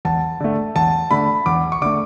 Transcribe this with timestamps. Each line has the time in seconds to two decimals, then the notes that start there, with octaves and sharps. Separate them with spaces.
0.05 E2 A5
0.40 D3 A3
0.76 E2 A5
1.11 D3 A3 B5
1.46 E2 D6
1.72 C#6
1.82 D3 A3 D6